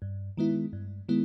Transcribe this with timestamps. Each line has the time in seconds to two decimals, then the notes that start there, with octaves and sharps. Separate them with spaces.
0.02 G2
0.37 D#3 G#3 B3 E4
0.73 G2
1.09 D#3 G#3 B3 E4